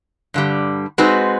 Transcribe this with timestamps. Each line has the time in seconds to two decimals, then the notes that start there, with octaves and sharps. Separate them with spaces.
0.34 G2 D3 G3
0.98 G#3 C4 D#4 F#4 B4